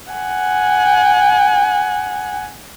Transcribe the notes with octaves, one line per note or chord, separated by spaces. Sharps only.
F#5 G#5